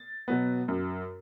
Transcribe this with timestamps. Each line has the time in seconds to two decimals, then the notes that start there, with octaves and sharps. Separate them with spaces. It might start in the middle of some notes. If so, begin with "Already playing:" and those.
Already playing: A6
0.28 B2 F#3 B3
0.68 F#2